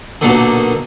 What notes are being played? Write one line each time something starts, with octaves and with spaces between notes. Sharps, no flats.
B1 A#2 D3